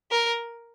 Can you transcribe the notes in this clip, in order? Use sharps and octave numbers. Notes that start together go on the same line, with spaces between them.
A#4